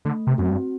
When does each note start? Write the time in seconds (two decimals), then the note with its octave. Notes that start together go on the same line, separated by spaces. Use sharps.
0.05 D3 A3
0.27 C3
0.38 F#2 C4 F#4
0.50 G2